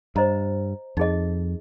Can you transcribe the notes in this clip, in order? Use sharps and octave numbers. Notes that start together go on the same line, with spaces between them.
G2 C5 D#5 A#5
F2 D#4 G#4 D#5